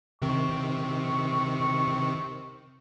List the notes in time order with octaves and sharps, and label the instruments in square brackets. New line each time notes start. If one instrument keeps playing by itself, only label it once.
[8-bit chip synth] C3 D#3 C4 [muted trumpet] C#6